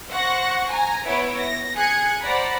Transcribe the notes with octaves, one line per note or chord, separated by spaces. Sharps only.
C5 F#5 C#6 F#6 A#6
G#5 A#5
B3 E4 C#5 D7
A#6
G#4 F#6 G#6 C#7
C5 D5 F#5 A#5 B5